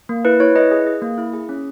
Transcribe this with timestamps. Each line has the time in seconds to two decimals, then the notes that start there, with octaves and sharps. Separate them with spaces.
0.09 A#3
0.25 E4 B4
0.40 E4 C#5
0.56 E4 B4 D#5
0.71 G#4
0.87 G#4
1.02 A#3
1.18 E4
1.33 G#4
1.49 C#4